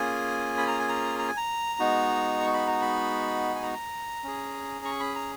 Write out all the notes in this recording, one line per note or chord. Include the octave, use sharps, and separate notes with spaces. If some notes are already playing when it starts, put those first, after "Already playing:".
Already playing: A#3 C#4 F4 G#4 G#5
B5
A#5
G#5
A#5
A#5
G#5
A#5
G#3 B3 D#4 F#4
C#6
B5
A#5
B5
G#5
A#5
C#4 G#4
C#6
B5
A#5